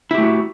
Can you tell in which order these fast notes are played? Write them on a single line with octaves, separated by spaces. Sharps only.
E4 G4 A3 F#4